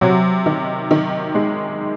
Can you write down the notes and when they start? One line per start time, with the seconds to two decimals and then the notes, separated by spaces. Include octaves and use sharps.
0.01 C3 F#3
0.46 D#3
0.91 D#3
1.35 G#3